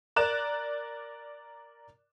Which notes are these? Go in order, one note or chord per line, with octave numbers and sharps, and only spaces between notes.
A#4 D5 F#6 E7